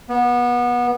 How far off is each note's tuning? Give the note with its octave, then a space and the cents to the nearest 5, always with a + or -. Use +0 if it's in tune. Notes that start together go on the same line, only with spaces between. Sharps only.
B3 -25